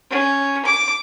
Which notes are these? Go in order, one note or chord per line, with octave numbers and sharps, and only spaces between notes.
C#4
D6